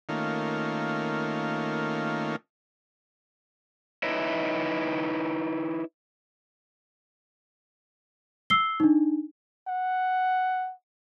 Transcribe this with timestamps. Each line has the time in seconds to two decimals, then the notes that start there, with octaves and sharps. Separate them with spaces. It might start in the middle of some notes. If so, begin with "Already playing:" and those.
0.09 D#3 A3 A#3 C#4 F4
4.03 D#4 E4 B4 C#5 D#5 E5
8.50 E6 C7 G7
8.80 D4 D#4
9.68 F#5